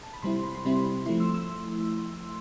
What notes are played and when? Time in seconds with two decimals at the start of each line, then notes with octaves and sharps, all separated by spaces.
0.03 A5
0.14 B5
0.22 C3 G3 C4 E4 C6
0.43 B5
0.55 C6
0.64 C3 G3 C4 E4 B5
1.06 F3 A3 E4 C6
1.20 E6
1.34 E6